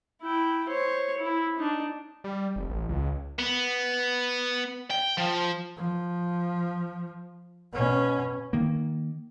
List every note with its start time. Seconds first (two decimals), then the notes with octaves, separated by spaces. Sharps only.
0.22 E4 G5
0.68 C5 C#5
1.18 E4
1.59 D4 D#4
2.24 G3
2.56 F1
2.70 A1
2.89 C#2
3.39 B3
4.91 G5
5.18 F3
5.77 F3
7.73 B2 C#4
8.53 D#3 A#3